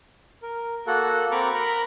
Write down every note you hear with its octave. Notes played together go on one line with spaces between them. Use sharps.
A#4
A#3 F#4 A4 F#5
C4 A#4 A#5 B5 C#6 D6
A#4 A#5 B5